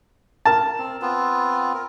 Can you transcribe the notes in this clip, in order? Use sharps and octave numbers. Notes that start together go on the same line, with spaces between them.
A#4 A5
C4
B3 C4 F4
A#4